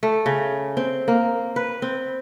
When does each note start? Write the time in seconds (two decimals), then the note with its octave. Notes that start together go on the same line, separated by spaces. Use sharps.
0.03 A3
0.26 C#3
0.77 C4
1.08 A#3
1.56 B4
1.82 C4